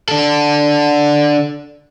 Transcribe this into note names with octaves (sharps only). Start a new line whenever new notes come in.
D4 A4